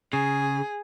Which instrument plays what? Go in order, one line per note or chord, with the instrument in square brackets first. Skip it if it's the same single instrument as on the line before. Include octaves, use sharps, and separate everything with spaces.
[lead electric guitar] C#3 [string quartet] G#4